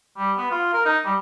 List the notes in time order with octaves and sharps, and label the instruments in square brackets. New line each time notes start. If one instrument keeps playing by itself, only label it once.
[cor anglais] G3
B3
F4
A#4
D#4
G3